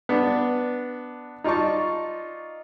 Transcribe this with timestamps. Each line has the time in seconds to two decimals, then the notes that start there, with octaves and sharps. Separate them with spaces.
0.09 B3 D4
1.44 D#4 F4 D5 A5 C#6